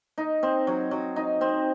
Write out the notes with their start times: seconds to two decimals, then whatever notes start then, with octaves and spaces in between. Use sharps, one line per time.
0.18 D#4
0.43 C4
0.67 F#3
0.91 F#3
1.16 D#4
1.41 C4